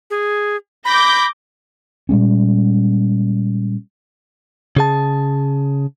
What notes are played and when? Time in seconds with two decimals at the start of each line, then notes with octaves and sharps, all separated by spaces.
0.10 G#4
0.85 B5 D6 G6 A#6
2.09 A#2 G3 G#3 C#4
4.77 C#3 G#4 A5